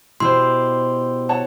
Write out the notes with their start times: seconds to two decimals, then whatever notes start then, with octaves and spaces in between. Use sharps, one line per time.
0.20 B2 E4 G4 C5 C6
1.29 C#5 F#5 A5